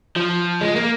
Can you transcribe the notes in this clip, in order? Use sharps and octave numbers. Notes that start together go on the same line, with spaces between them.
F3
G#3
A#3